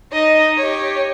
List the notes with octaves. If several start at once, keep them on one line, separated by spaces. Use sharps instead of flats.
D#4 D#5
G4 C#5